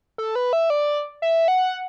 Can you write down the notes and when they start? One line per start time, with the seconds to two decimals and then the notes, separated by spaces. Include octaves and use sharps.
0.18 A4
0.35 B4
0.53 E5
0.70 D5
1.22 E5
1.48 F#5